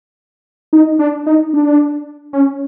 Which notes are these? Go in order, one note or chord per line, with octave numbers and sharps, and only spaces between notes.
D#4
D4
D#4
D4
C#4